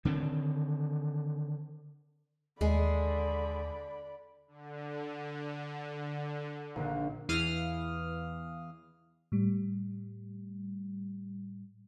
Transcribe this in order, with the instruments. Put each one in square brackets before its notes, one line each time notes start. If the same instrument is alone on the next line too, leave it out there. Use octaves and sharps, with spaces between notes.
[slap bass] D3 D#3 C4
[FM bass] D#2 [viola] D3 B5 [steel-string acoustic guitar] G#3 G#4 [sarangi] D5
[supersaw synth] D3
[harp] A#1 D3
[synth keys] E2 E3 F5 D#6 F6
[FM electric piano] A2 G3